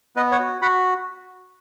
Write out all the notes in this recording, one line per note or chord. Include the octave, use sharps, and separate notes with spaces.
B3 B4 D#5
C#5 F#5
F#4
F#4 F#5 B5